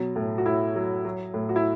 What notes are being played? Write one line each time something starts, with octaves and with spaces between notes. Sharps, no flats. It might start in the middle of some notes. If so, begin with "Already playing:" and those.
Already playing: B2 F#3
A2
F#4
A2 E4
F#3
F#3
A2
F#4
E4